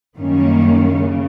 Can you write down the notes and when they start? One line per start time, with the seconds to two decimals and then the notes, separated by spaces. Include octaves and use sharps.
0.17 F#2 D#3 G3 A#3 C#4
0.98 C#3